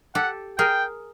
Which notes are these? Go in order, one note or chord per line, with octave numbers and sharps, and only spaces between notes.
G4 A4 F#5
G#4 A#4 G5